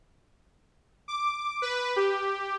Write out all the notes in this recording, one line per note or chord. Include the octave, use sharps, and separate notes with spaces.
D6
B4
G4